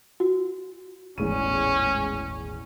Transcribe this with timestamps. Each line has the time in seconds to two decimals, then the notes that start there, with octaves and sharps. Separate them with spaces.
0.20 F#4
1.18 D#1 G#1 E2 A2 G#3 C#4 D#7